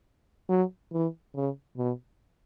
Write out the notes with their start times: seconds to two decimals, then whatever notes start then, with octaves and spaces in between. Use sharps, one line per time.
0.49 F#3
0.93 E3
1.35 C#3
1.78 B2